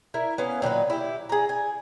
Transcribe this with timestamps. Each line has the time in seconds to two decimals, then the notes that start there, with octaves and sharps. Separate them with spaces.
0.14 E4 A#4
0.38 B3 C#4 F5
0.62 A#2 D#3 F#3 B4
0.90 E4 G4
1.29 G#4 A#5
1.49 G#5